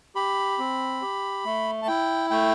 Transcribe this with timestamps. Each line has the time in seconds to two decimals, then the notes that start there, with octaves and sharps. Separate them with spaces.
0.15 G4 B5
0.59 C4
1.02 G4
1.45 A3
1.82 A5
1.87 E4 G5
2.31 A3 G5